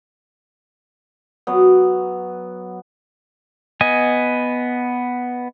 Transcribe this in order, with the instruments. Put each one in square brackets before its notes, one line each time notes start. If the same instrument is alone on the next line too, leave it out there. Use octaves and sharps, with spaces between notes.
[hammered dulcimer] F#3 B3
[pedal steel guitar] B3 D#5 G#5